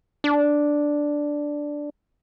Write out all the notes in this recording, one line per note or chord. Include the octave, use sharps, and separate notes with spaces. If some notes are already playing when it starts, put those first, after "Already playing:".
D4